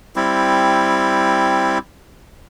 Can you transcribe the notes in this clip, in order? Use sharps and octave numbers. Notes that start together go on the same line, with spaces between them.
G3 C4 E4